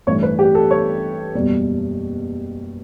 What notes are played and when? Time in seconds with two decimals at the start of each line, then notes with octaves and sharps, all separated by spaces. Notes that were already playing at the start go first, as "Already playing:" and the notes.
0.07 A1 G2 E3 A3 C#5
0.23 B4
0.39 G4
0.55 A4
0.71 C#5
1.34 F#1 E2 B2 G3